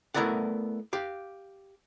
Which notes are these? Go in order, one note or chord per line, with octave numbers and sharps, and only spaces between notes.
A3 B3 E4 A#4 D5 F#5
G4 F5